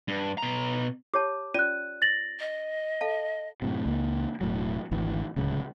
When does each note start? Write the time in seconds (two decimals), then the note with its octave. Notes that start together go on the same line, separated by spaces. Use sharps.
0.08 G2
0.38 B2 A#5
1.14 G4 C#5 A5 D6
1.54 C#4 F4 D5 F#6 D#7
2.02 A6 A#6 F#7
2.40 D#5
3.01 A4 F5 A5
3.62 F#2 A2 C3
3.86 C#2 A#3
4.41 E1 A2 F#3
4.91 G#1 D2 E3
5.36 D1 C#2 C#3